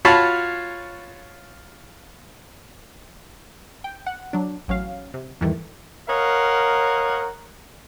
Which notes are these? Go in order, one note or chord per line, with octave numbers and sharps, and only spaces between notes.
F4 F#4 C#5 F5 A5 B5
G5
F#5
F#3 D4
A1 F#3 C#4 F5
C3
E2 G#2 D#3 E3 G3 A3
A#4 C#5 D#5 F5 F#5